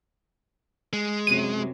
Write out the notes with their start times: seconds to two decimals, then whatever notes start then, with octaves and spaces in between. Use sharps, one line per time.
0.93 G#3
1.27 F#2 C3 F#3 D#7